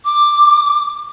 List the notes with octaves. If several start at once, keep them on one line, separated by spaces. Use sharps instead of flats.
D6